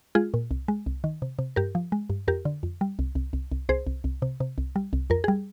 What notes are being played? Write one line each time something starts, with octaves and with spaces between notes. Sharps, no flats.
G#3 F4 G#4
A#2
C2
G#3
C2
D#3
C3
C3
G2 G4 A#4
F3
G#3
G2
F2 G4 A#4
D3
F2
G3
C2
C2
C2
C2
C2 G#4 C5
C2
C2
C3
C3
C2
G3
C2
F2 A#4
G3 G#4